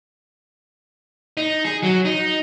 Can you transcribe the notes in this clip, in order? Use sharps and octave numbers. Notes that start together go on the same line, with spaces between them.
D#4
G#4
F#3
D#4